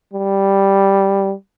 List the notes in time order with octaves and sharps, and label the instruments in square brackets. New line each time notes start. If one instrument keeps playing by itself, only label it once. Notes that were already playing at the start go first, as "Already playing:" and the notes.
[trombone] G3